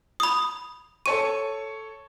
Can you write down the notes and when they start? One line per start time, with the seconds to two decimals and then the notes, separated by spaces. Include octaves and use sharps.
0.20 B5 D#6
1.06 A4 C#5 C#6 D#7